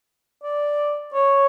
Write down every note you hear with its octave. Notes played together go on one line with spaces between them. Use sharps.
D5
C#5